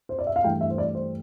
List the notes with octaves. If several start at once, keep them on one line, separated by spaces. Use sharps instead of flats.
C5
D5
E5
F5
G2 E3 A3 G5
E5
C5
D5
C5